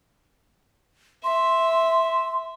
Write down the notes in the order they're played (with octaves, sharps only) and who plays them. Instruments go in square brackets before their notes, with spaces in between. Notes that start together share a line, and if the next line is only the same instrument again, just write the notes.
[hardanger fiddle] E5 [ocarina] C6